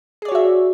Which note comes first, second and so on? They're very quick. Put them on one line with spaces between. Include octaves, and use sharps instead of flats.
G#4 D5 C#5 F#4 E5